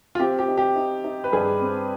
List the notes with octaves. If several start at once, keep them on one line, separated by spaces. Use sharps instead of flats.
F4
C4 G4
G4
D#4
G4
D#4
D#4
B4
G2 G#4
C4